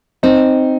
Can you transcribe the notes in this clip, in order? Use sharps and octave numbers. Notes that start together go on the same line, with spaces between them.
C4 D#4